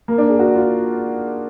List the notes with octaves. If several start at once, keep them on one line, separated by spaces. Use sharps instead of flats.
A#3
D4
G#4
F#4
F4